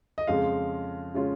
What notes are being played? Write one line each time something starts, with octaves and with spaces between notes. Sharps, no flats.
D#5
F2 C#3 G#3 C#4 F4 F5
C#3 G#3 C#4 F4